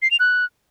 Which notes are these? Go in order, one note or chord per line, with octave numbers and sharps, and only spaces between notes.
C7
F7
F#6